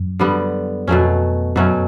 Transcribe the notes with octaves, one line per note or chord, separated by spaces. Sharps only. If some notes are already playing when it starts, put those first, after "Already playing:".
Already playing: F#2
D3 G3 B3
F2 B2 F#3 A3 C#4
F#2 B2 F#3 A3 C#4